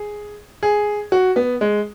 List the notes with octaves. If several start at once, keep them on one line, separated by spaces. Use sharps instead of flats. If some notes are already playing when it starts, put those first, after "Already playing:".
Already playing: G#4
G#4
F#4
B3
G#3